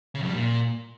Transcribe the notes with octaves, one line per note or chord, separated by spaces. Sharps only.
C#3
F2
G3
A#2